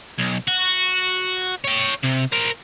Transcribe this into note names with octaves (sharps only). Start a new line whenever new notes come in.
B1
F#4
C#5 G5
C3
A#4 C5